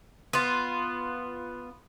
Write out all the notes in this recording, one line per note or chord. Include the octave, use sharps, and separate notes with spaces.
B3 F4